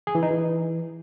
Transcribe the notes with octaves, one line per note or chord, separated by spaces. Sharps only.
G#4
E3
D#4
E3